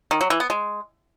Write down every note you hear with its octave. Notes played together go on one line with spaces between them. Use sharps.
D#3
F#3
E3
B3
G#3